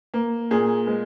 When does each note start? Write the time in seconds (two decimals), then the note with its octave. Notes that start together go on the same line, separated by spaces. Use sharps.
0.14 A#3
0.51 A#2 G#4
0.87 G#3